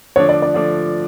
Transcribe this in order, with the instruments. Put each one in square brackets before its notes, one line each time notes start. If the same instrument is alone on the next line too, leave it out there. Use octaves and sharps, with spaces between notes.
[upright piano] D3 F3 A3 D4 [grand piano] C#5
[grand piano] D5
D5
[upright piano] D3 F3 A3 D4